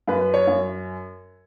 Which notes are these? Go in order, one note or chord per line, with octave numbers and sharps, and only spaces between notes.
F#2 B4
C#5
F#2